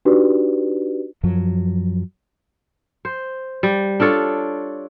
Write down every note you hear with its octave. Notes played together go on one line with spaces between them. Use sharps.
D4 D#4 F#4 G4 B4 D5
F#2 F3 F#3
C5
G3
D4 F4 A4 C#5